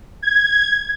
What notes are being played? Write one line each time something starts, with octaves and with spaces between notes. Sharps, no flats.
G#6